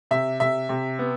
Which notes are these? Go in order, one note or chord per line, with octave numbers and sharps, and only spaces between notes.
C3 E5
C3 E5
C3
B3